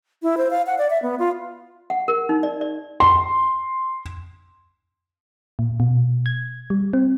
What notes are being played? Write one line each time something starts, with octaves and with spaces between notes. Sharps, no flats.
E4
C5
F5
F#5
D5
E5
B3
F4
F#5
A#4
D#4
D5
D5
C6
A#2
B2
G#6
G3
C4